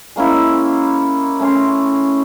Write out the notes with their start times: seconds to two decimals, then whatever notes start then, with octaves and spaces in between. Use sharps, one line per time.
0.16 G#3 A#3 C#4 E4
1.40 A3 C#4 C6